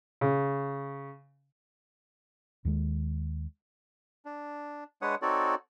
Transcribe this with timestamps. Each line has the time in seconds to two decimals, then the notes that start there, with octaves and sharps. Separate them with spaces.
0.21 C#3
2.65 D#2 D#3 G#3
4.25 D4
5.02 G#3 D4 B4 C#5 F#5 D#6
5.22 C4 D#4 F#4 A4 C#5 D5